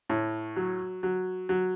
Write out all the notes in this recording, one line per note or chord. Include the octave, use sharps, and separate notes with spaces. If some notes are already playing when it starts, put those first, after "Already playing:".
A2
F#3
F#3
F#3